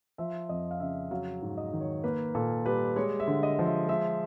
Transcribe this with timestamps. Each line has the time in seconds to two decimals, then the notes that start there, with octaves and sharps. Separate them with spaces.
0.18 F3 E5
0.49 F2 D#5
0.71 F5
0.80 C#3 E5
1.11 F#3 F5
1.42 G#2
1.57 D#5
1.73 D#3
1.80 C#5
2.04 A#3 B4
2.35 A#2 A4
2.66 G3 B4
2.96 G#3 C#5
3.20 E5
3.28 D3
3.43 D#5
3.59 F3
3.66 E5
3.88 G#3 E5